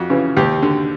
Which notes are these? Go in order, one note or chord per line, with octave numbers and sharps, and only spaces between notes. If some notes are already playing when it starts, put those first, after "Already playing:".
Already playing: F2 F#4
C#3 E3
D#2 G4
D3